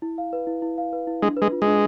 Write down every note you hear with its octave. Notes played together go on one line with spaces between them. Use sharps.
E4
F5
B4
E4
E4
F5
B4
E4
G#3 D4
B4
G#3
F4
G#3 D4